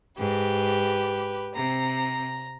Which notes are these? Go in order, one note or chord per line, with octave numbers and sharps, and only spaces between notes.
G#2 G4 B4
C3 C4 A#5